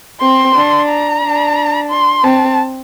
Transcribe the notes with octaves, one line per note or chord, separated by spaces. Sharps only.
C4 C6
D4
A#5
D4
C6
C4 A5